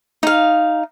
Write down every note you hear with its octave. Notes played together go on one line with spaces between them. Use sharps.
D#4 F5